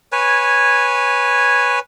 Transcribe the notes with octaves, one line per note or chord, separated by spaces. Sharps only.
B4 C#5 G#5